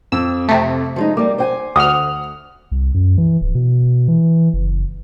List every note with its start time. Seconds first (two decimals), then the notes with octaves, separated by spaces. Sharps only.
0.12 F2 E6
0.48 C3 A3
0.96 F3 G#3 D#4
1.17 G3 A#3 D6
1.38 C5 G5 G#5
1.76 D2 F#5 D#6 F6
2.71 C2
2.94 F#2
3.18 E3
3.41 D1
3.55 B2
4.08 E3
4.53 F#1